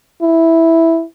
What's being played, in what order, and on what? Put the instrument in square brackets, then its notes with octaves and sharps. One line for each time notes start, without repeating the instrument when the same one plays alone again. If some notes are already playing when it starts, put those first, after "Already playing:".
[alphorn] E4